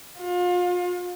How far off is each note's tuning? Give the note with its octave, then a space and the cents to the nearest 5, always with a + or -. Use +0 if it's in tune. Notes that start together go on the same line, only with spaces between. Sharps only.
F4 +35